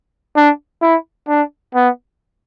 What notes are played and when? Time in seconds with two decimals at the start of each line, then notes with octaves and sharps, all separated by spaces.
0.36 D4
0.82 E4
1.28 D4
1.74 B3